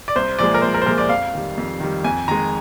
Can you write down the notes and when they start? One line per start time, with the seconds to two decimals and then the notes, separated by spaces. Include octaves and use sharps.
0.08 D5
0.16 C2 C5
0.39 A#2 F3 G#3 D5
0.54 A#4
0.62 C2 C5
0.74 A#4
0.82 C5
0.86 A#2 F3 G#3 A#4
0.98 D5
1.09 F2 F5
1.34 D#3 G3
1.58 F2
1.80 D#3 G3
2.04 F2 G#5
2.28 D#3 G#3 A#5